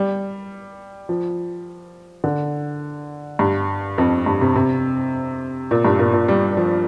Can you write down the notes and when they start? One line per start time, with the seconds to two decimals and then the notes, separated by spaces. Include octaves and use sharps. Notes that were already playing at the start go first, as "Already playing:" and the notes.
Already playing: G3
1.09 F3
2.24 D3
3.39 G2
3.98 F2
4.26 G2
4.41 C3
4.56 C3
5.71 A#2
5.85 G2
5.99 A#2
6.13 A#2
6.28 G3
6.57 F3